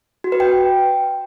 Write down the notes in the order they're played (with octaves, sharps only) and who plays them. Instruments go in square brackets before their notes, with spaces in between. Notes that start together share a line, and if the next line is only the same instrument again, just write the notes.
[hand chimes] F#4
B4
G5